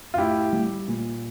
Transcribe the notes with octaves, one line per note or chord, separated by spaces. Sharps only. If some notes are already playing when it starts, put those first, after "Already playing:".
F4
A2 E4 G4
G3
A#2